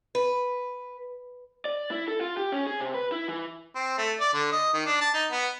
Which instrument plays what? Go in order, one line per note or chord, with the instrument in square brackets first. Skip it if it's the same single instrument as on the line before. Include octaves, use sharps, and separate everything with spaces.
[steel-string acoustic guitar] B4
[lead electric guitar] D5
E4
A4
F4
G4
C#4
G#4
C3
B4
E4
E3
[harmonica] C4
A3
D5
D3
D#5
D#3
D4
A5
D#4
B3